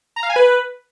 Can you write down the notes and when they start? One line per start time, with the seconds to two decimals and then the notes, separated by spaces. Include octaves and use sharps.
0.16 A#5
0.23 F5
0.29 G#5
0.36 B4